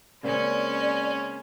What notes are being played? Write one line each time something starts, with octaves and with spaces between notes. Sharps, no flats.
C#3 G#3 A#3 C4 C#4 D5